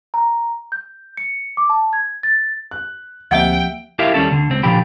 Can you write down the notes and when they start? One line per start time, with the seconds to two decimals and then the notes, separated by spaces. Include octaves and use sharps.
0.14 A#5
0.72 G6
1.17 C#7
1.57 D6
1.70 A5
1.93 G#6
2.23 A6
2.71 F#6
3.31 D2 F3 A#3 C4 G4 E5 F#5 G5
3.99 E4 G4 A#4 E5 F5
4.14 D#2 G3 C#4 A4
4.31 D2 D3
4.50 C#2 C4
4.63 A#2 D3 F3 G4 G5 B5